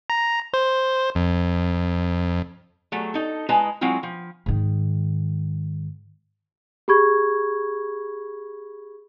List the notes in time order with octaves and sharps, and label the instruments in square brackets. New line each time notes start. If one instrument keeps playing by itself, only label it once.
[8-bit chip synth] A#5
C5
F2
[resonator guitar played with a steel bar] F#3 A3 G#4
D#4 A4
G#3 E4 B4 D#5 A5 A#5
F#3 G#3 C4 E4 F4
F3
[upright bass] G#2 D#3
[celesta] G4 G#4 B5 C#6 G#6